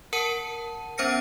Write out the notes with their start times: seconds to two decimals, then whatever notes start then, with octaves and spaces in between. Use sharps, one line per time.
0.13 A#4 F#5 A5 D#7
0.98 B3 C#4 C5 F6 A#6 C#7